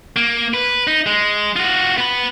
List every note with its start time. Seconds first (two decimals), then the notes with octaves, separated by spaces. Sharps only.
0.16 A#3
0.54 B4
0.87 D#4
1.06 G#3
1.56 F4 F#4
1.98 B3 B5